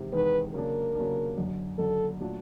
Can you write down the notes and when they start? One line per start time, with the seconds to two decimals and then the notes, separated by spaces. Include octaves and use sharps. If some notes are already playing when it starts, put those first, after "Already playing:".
Already playing: E2 C3 D#3 G#3
0.13 E2 C3 D#3 G#3 B4
0.54 C#3 F#3 A#3 D4 A#4
0.95 C#3 F#3 A#3 D4
1.37 F#1 F#2 D3
1.78 F#1 F#2 D3 A4
2.20 A#2 F#3 A3 D4 F4